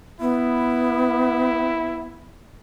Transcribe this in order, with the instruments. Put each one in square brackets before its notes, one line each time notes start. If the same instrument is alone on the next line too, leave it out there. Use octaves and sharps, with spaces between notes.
[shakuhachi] B3 [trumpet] E4